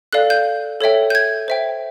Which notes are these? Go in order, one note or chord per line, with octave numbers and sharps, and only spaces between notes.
A4 D5 F5 F#6
G6
A4 C#5 E5 G5
G6
G#6
C5 E5 G5